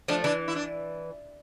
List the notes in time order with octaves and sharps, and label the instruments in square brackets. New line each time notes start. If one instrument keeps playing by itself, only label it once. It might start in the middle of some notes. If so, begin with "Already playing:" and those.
[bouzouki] F3 A3 [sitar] D4
[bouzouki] E3 [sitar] D4
[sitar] E4
D4